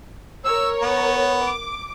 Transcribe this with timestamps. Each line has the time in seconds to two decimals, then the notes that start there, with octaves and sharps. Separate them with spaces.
0.45 A#4 C#5 E6
0.82 B3
1.43 D6